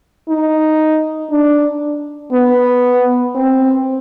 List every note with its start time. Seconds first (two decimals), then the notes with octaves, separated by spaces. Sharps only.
0.29 D#4
1.31 D4
2.32 B3
3.35 C4